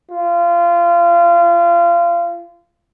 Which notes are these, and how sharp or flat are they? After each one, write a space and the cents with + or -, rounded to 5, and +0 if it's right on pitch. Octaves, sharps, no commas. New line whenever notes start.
F4 -25